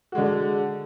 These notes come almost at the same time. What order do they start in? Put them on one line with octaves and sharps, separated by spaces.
F#4 G#3 D3